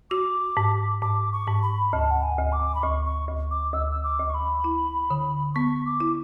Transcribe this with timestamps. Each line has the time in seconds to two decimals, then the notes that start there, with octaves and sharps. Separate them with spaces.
0.11 F#4 D6
0.57 G#2
1.02 G#2 D6
1.32 C#6
1.47 G#2
1.63 B5
1.93 D2 A5
2.11 F#5
2.23 G#5
2.38 D2
2.52 D6
2.75 B5
2.83 D2 C#6
3.05 C#6
3.29 D2
3.51 D6
3.74 D2 E6
3.91 E6
4.04 D6
4.19 D2
4.30 C#6
4.34 B5
4.64 E4
5.10 D3
5.55 B3 C#6
5.86 D6
6.00 E4